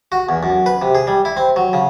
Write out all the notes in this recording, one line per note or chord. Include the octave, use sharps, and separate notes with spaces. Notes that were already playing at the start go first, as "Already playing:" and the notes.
F#4
E2
F#2
B4
C3
G#4
G3
E4
C4
F#3
C#3